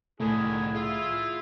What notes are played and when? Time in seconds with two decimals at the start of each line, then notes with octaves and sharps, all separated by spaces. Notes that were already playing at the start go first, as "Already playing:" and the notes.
0.20 C2 A2 D3 D#3 A3 E4 G#4
0.75 E4 F4 G#4